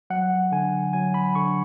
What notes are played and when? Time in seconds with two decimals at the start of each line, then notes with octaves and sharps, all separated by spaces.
0.10 F#3 F#5
0.52 D3 G#5
0.93 F#3 G#5
1.14 B5
1.35 D3 C#6